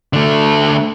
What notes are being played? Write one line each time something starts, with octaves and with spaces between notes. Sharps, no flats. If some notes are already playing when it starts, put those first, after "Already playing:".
D3 A3